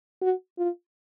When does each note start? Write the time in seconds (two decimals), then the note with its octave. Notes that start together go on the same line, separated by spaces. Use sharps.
0.22 F#4
0.58 F4